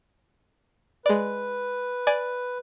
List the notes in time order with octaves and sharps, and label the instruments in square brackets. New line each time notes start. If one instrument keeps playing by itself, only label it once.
[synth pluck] G#3 D5 [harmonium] B4
[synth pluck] D5 G#5